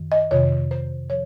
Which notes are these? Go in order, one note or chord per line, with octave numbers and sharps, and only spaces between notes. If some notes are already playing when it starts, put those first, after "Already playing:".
Already playing: F#2 D#3
D#5
F2 C3 D#3 C#5
C5
F3 C#5